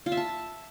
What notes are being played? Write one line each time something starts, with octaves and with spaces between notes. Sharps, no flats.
F4
E5
A5